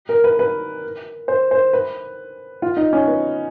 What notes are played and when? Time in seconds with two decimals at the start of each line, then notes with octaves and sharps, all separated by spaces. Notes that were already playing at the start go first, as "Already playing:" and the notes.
0.09 A#4
0.24 B4
0.39 B4
1.28 C5
1.51 C5
1.73 B4
2.62 F4
2.77 D#4
2.93 C#4
3.07 B3